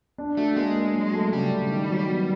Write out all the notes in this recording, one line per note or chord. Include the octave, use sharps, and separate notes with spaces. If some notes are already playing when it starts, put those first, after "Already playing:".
D4
A3 F#4
G#3 A#3
A#3
F#3
A3
C#3 G3
C#3
D#3
F#3
B3